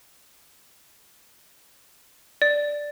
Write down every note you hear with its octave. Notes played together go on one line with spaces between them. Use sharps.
D5